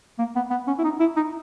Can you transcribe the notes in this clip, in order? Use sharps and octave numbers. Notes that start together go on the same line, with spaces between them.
A#3
B3
B3
C#4
E4
D#4
E4
D#4